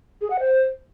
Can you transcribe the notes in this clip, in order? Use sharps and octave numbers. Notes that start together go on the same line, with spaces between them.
G#4
F#5
C5